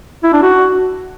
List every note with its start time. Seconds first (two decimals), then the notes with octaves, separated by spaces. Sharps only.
0.24 E4
0.33 D4
0.42 F#4